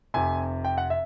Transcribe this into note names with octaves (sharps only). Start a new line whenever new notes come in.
F1 F2 C3 G#5
G5
F#5
E5